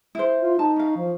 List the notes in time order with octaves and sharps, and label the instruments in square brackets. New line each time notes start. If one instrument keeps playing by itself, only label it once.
[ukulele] E4 C5
[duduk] F4
[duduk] D#4 [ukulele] A5
[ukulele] C#4 F5
[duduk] F3